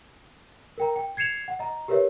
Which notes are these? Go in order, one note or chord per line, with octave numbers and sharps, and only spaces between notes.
A#4 G5 A#5
G5
G#6 C7 C#7 E7 F7
F#5
D#5 A#5
G4 A#4 B4 C#5 E5